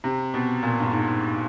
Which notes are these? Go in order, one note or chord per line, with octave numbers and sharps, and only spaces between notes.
C3
B2
A#2
G2
G#2